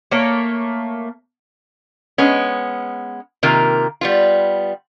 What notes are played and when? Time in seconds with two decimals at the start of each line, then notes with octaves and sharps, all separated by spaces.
0.11 A3 A#3 C#5
2.18 G#3 B3 C#4
3.43 C3 D#3 A#3 F4 A#4
4.01 G3 B3 F4